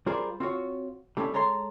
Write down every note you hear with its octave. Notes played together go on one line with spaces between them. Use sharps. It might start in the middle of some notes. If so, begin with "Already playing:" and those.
G3 F4 G#4 A#4 C5 D5
C4 F4 F#4 C#5
G3 A3 C4 C#4 E4
G#3 A4 C#5 A#5 C6